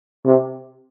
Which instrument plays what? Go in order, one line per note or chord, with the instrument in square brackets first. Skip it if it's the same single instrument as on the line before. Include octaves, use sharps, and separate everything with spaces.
[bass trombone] C3